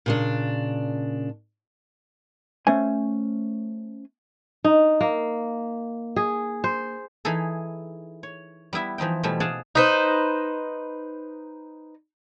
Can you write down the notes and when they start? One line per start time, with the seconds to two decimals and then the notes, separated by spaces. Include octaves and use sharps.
0.06 A#2 C#3 D4
2.67 A3 C#4 C5 G#5
4.64 D#4
5.01 A#3
6.16 G#4
6.64 C5
7.25 E3 D#4 G#4 A4
8.23 C#5
8.73 G3 B3 E4 E5
8.98 E3 F3 D#4 G5
9.23 B2 E3 F3 G3 A3
9.40 G#4 D5 F5 F#5 G#5 A5
9.75 D#4 B4 C5